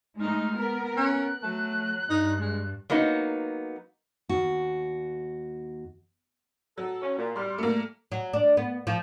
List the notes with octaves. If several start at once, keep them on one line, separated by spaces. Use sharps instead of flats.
G#3 A3 D#4 F6
B3 A#4
C#4 F#6
F#3 A3
G2 D#4
G#3
F#3 A#3 B3 D#4
D#2 F#4
F#3 A4
C#4
A#2
G3 C6 F6
A3 A#3
F#3
D4
B3
F3